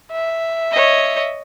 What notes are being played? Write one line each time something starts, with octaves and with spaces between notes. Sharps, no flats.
E5
C#5 D#5